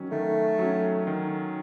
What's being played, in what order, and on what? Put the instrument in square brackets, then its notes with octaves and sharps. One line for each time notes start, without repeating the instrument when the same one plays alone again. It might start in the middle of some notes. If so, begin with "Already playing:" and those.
Already playing: [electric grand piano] D#3 F#3 C#4
[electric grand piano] D#3 [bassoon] A3
[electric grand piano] F#3 C#4
D#3